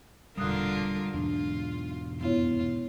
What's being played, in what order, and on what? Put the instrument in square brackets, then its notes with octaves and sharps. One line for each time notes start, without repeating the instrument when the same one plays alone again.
[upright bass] E1 A#2 [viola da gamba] D3 F4 A#4 [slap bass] G3 [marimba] D#6 F#6
[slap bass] E2 G#2 B2 [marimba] D4 [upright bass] D#4 [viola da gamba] F4
[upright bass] F1 [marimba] B3 E4 C#5 [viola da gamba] F4